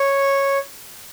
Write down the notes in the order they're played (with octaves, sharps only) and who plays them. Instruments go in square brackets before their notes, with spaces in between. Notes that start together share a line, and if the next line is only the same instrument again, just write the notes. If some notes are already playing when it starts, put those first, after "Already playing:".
Already playing: [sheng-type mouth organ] C#5